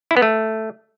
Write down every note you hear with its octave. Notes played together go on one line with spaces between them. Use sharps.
E4
B3
A3